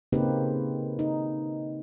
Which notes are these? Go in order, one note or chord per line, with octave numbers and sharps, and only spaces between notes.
C#3 A#3 C4 D#4 G4 B4
D#4